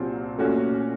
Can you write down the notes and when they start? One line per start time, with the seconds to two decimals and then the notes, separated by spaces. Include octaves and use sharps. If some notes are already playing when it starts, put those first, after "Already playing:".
Already playing: C2 A#2 F#3 C4 F4
0.38 A#2 A3 C#4 F#4